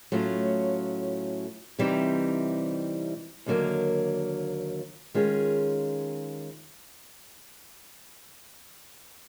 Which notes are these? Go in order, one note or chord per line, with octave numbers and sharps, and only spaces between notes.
A2 F#3 A3 C#4 F4
C3 E3 G3 C4 D#4
D#2 D3 F#3 A#3
D#3 G#3 C#4 F4 G#4